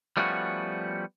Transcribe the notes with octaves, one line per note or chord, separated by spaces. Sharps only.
F3 G3 A3 B3 C#4 F#4